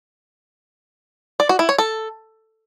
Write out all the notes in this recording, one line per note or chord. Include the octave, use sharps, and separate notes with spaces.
D5
F#4
E4
C#5
A4